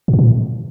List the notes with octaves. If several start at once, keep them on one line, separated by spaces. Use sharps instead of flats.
G#2
G2
A#2